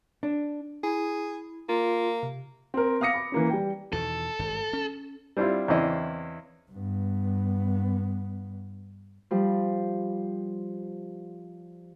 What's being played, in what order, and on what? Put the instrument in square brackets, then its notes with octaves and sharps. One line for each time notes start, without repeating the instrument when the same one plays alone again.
[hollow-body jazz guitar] D4
[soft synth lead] E4 [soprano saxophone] G#4
[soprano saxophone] A#3 [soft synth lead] F4
[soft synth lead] C3
[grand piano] C4 A#4
B3 F5 D6 D#6 A#6 C#7
B5 D6
E3 A#3 C#4
G3 G5
[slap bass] E2 B2 D#3 [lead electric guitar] A4
[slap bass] G#1 G2
C#4
[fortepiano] G3 C4 D4 E4 F4
E2 C#3 C4 D4 E4 D#5
[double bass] G2 B3
[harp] F3 G3